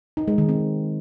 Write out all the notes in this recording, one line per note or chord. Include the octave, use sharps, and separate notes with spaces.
D#4
G#3
D#3
C4